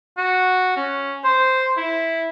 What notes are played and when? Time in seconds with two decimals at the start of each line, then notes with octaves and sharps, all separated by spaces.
0.17 F#4
0.76 C#4
1.24 C5
1.78 E4